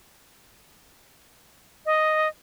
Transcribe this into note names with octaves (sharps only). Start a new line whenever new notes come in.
D#5